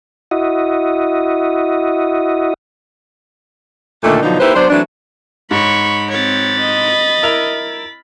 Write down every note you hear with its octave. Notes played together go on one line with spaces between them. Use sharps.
E4 F#4 D#5
A#2 D3 D#3 A3
B2 D3 F3 F#3 D4 D#4
A#3 D#4 E4 G4 B4 C5
F#3 B3 D4 C5
E3 F#3 A3 C4 D4
G#2 C#5 B5 C#6
C4 C#5 B5 A6
D#5
E4 A#4 F7